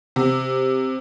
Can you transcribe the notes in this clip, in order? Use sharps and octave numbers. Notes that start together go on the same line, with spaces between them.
C3